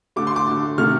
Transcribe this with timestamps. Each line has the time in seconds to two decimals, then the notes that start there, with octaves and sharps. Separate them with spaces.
0.16 D3 A3 D6
0.27 C6
0.36 D6
0.48 D3 A3
0.78 C3 D#3 A3 F6